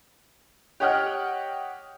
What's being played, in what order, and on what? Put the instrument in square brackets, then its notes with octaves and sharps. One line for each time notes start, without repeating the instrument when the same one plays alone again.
[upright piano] G4 C#5 D#5 F#5 G5 F6